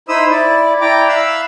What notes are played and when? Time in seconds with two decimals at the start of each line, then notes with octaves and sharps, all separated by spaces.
0.09 D#4 E4 C5 B5 D#6 E6
0.31 E4 D5
0.81 E4 D5 G5 A#5 D6
1.09 E5 F5 B5 E6 F#6